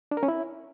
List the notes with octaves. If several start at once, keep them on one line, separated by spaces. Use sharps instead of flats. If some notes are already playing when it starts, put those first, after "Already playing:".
D4
A#4
C#4
E4